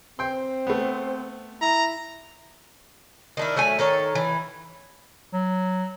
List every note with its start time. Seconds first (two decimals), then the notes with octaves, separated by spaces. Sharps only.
0.19 C4 G5 C6
0.67 A3 B3
1.61 E4 A#5
3.37 D#3 D4 E4
3.57 F#3 A3 E5 G#5
3.79 D#3 A4 C#5
4.15 E3
5.33 F#3